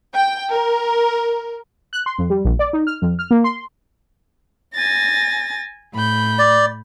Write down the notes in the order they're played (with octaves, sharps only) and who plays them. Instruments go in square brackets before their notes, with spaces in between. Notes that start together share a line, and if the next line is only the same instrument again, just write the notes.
[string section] G5
A#4
[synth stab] F#6
C6
F2
G3
A#1
D5
D#4
F6
F2
F6
A#3
C6
[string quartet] G#5 A6 A#6
A2 B5 G6
[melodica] D5